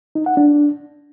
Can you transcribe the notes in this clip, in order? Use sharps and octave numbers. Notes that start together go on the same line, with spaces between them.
D#4
F#5
D4